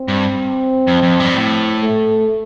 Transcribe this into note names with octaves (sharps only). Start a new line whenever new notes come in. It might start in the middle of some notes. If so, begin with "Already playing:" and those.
Already playing: C4
G2
F2
F2
G2
A2
A3